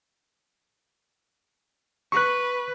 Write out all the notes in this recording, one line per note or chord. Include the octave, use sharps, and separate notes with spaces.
B4 C#6 F#6